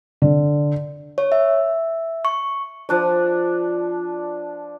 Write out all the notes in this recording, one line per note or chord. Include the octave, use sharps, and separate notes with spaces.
D3
C#5
E5
C#6
F3 D4 D5